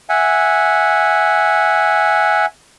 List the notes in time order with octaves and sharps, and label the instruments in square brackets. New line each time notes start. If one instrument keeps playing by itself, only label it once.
[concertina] E5 F#5 G#5